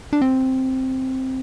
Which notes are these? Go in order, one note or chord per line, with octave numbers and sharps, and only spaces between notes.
D4
C4